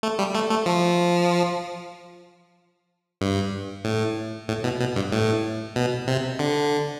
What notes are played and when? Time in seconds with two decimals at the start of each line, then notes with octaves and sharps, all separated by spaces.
0.03 A3
0.19 G3
0.35 A3
0.50 A3
0.66 F3
3.21 G2
3.85 A2
4.48 A2
4.64 B2
4.80 B2
4.96 G2
5.12 A2
5.76 B2
6.07 C3
6.39 D3